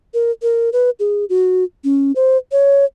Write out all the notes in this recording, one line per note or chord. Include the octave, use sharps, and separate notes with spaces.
A#4
A#4
B4
G#4
F#4
C#4
C5
C#5